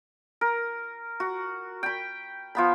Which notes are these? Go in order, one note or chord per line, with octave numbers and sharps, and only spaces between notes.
A#4
F#4
G5 B5
F3 B3 B5